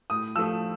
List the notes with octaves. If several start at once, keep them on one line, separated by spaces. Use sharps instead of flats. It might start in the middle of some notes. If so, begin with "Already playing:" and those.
A2 D#6
F3 A3 E6